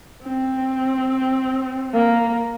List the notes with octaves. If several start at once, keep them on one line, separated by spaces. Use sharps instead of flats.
C4
A#3